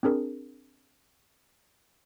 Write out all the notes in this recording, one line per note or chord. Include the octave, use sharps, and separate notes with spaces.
C4 D4 G#4 A#4